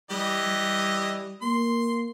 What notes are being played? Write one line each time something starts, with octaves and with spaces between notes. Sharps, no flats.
E3 G3 G4 D#5
G3
A#3 C6